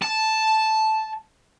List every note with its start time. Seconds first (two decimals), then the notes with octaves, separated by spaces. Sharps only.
0.02 A5